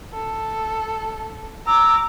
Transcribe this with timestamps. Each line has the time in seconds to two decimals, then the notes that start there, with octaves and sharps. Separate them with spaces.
0.13 A4
1.66 A#5 D6 E6